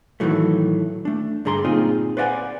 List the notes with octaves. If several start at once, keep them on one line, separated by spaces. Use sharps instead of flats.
A2 D#3 E3 F#3 A3
A3 D4
G2 D3 G#4 A#5 C6
A#2 C4 D#4 F4 G#4
B4 C5 D5 D#5 F#5 G#5